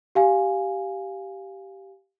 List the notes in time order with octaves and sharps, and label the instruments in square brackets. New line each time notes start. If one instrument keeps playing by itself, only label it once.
[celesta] G4 F5 G#5